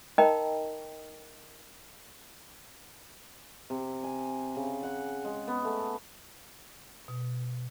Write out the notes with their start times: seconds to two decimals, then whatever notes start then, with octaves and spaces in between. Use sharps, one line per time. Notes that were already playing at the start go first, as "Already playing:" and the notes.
0.18 D#4 A#4 D#5 G5 A#5 B5
3.70 C3
4.03 G#5
4.56 C#3
4.83 F#5
5.25 G#3
5.48 B3
5.64 A3
7.08 B2